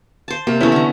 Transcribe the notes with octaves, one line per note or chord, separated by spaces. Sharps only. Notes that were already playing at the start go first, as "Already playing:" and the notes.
C5 A5
C3 A#3
E3 A3 B3 C#4 E4
D3 A#5